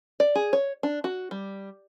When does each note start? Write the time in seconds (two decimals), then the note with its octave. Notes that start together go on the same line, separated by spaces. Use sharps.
0.20 D5
0.36 G#4
0.53 C#5
0.83 D4
1.04 F#4
1.31 G3